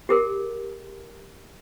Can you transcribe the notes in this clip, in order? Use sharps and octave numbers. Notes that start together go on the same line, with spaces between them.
G4 G#4 A#4